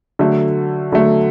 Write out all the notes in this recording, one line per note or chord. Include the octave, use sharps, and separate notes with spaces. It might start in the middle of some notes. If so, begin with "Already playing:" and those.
D3 F#3 A3
D3 F#3 A3